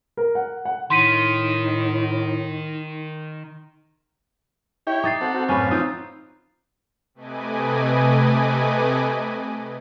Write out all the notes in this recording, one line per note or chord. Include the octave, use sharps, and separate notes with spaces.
A#4
F#5
F#5
A2 D#3 D#4 C6 B6 D#7
E4 G4 C#5 G5
D#4 D6 A6 C7
C4 F#4 A4
C4
F#2 A2 C#4 B4 F5
F3 C4 D#4 F4 D#6
C3 A3 B4 D#5 G#5 D6